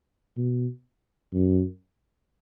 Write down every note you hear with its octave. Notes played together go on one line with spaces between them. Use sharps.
B2
F#2